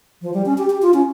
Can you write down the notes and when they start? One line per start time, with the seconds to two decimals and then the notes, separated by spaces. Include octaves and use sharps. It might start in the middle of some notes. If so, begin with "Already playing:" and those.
0.22 F3
0.34 G3
0.46 C#4
0.58 G4
0.70 G4
0.82 F4
0.94 C#4